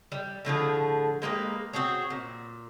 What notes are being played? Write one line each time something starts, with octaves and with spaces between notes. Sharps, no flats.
G3
A2 D3 F3 G#4
G#3 A#3 G4 B4
C4 F#4 G#4 C#5
A#2